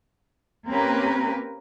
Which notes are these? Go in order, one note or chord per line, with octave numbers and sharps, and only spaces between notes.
A#3 C4 C#4 G4 A#4 B4